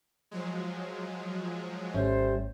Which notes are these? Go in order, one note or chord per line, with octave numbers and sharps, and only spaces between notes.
F3 F#3 G#3
G#1 G3 A3 C#4 C5